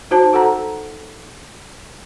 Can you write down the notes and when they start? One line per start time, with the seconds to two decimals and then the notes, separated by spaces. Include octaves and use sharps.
0.11 D#4 F#4 C5 A5
0.33 F#4 A4 F#5 A#5